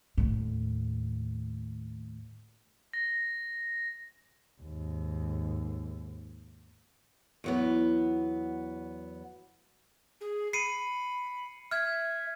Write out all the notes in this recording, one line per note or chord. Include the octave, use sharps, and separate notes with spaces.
D#2 A2
A#6
D#2 G#2
E2 F#3 B3
G#4
B5 C7 C#7 D#7
E5 F6 G#6